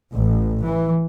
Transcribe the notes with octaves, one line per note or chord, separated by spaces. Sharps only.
A1
E3